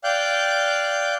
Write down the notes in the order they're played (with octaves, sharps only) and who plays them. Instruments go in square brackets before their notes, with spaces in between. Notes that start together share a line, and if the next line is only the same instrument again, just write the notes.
[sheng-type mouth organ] D5 F5 G5 F#6 G6